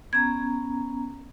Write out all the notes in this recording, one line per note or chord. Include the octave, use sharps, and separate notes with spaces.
B3 C#4 A#5 G#6